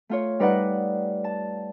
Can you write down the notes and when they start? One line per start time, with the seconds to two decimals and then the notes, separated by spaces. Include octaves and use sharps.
0.09 A3 F4 C#5
0.39 G3 D#4 B4 D5 D#5 F#5
1.24 A5